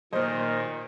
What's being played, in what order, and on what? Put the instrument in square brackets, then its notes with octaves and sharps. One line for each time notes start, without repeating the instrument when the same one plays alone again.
[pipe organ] A#2 [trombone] D#3 [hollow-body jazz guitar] F#3 A#3 [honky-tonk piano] C5 D#5